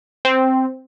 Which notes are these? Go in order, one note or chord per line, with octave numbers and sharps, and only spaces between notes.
C4